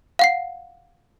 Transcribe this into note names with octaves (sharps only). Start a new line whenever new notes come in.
F5 F#5 C7